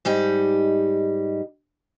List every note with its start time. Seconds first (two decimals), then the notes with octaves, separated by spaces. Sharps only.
0.05 G#2 G3 D#4 G4